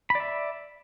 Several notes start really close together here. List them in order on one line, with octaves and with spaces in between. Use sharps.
B5 D5 E5